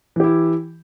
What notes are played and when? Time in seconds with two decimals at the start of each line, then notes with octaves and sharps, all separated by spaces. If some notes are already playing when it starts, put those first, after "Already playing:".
0.16 E3
0.20 G4
0.24 E4